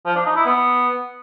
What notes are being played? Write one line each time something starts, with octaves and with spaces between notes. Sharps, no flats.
F3
D4
D#4
E4
B3